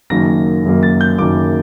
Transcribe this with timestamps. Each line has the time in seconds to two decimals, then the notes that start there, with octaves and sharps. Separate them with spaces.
0.10 F#1 F#2 D#3 F#3 A#3 A#6
0.64 F#1 F#2 D#3 F#3 A#3
0.83 A6
1.01 G6
1.18 F#1 F#2 D#3 F#3 A#3 D6